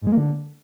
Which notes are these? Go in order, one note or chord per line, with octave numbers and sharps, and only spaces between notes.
G#2
G#3
A#3
D3